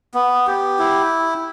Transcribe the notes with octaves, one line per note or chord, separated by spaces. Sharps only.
B3
G4
E4